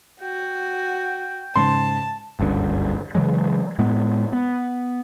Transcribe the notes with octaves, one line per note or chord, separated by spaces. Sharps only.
F#4 G5
G#2 C#3 A5 C6
F#1 C#2 G2 D3
C#3 E3 F#3 G#3
A2 G#3 B3
B3